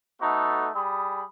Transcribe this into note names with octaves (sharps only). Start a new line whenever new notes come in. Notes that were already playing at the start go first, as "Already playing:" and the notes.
A3 B3 D#4 F#4 A4
G3 G#4 B5 D#6